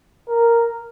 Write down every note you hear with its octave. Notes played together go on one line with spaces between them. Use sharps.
A#4